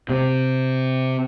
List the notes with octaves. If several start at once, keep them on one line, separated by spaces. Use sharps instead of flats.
C3